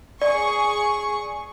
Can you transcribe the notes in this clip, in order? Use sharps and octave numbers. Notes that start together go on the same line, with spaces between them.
G#4 D5 C#6